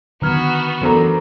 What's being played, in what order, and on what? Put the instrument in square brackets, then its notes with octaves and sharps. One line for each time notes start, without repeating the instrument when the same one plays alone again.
[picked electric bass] D3 D#3 F#3 [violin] B3 F#4 [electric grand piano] A#5 F6 G#6
[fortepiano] F#2 A3 D4 [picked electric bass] E3 B3 [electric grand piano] A4 C5 A#5